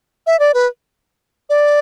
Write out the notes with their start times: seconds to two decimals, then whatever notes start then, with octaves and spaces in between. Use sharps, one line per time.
0.27 E5
0.39 D5
0.54 B4
1.50 D5